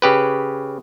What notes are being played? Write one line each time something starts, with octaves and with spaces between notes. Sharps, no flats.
C#3 G4 B4